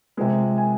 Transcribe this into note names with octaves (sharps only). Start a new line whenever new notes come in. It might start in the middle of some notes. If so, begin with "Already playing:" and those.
C3 F3 G#3
G#5